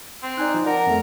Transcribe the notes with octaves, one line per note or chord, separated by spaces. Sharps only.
C4
D#4 D5 G#5 F#6
F3
A#4 D5 F#5 A5
F2 A3